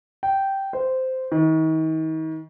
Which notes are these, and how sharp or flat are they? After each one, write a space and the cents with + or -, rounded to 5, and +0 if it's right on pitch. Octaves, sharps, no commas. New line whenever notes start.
G5 -10
C5 -10
D#3 +40